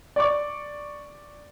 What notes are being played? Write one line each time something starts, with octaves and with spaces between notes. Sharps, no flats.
D5 C#6 D6